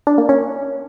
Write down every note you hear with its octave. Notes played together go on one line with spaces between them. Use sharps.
D4
A#3
C#4